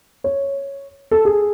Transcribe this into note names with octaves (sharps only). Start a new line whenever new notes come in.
C#5
A4
G#4